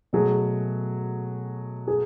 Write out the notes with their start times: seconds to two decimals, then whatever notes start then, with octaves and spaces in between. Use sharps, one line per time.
0.13 B2 F#3 A3 G#4
1.88 G#4